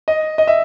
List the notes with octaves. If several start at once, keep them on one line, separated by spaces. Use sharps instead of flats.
D#5
D#5
E5